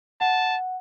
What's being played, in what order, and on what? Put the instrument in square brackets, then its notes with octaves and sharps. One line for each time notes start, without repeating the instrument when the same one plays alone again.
[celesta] F#5 [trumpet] A5